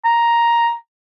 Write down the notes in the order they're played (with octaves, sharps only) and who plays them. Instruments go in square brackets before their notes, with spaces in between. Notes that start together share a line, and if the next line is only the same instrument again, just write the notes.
[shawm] A#5